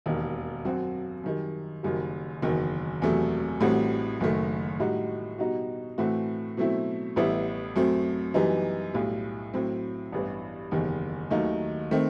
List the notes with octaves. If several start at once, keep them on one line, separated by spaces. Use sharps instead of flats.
E1 D#2 D#3
F#2 F#3 C4 F#4
F#2 D#3 G3
F#1 F#2 D#3 G3
F#1 E2 D#3 F#3
E1 E2 C3 F#3 A3
A1 A2 G3 C4 F#4
F#1 F#2 D#3 A3
A2 G3 D#4 F#4
B2 G3 D#4 F#4
A2 E3 A3 C4 F#4
B2 F#3 A3 C4 E4
A1 A2 G3 B3 E4
F#2 F#3 A3 C4
F#2 E3 G3 B3 D#4
B1 A2 G3
A2 F#3 C4
A1 G2 E3 B3
F#1 E2 D#3 G3
D#2 D#3 F#3 A3 D#4
D#3 A3 C4